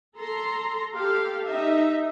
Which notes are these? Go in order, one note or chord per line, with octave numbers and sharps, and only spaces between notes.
A4 A#5 C6
G4 A4 F5
D#4 E5